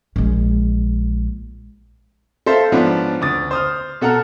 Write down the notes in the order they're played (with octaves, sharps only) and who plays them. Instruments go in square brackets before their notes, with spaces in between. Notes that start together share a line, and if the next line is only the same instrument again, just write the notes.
[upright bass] A#1 G#3
[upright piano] A4 C5 E5 F5
G#2 F3 B3 C#4 D4
D2 D6 D#6 A6
C5 D#6 F6
B2 A4 F#5 A#5 F6